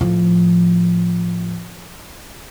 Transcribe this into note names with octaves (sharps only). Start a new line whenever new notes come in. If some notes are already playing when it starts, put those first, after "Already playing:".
A2 F3